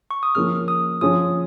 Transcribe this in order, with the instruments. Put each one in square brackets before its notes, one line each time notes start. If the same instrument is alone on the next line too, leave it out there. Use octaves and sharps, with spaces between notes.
[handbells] C#6
D#6
[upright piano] F3 A#3 C#4 G#4 [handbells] F6
[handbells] D#6
[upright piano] F3 C#4 F4 G#4 C#5 [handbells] D#6